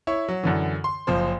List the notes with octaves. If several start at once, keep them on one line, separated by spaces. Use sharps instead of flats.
E4 C#5
F#3
F#2 D3 E3
C6
F#1 F3 C5